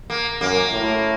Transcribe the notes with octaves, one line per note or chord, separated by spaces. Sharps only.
A#3
F#2 A#3
A2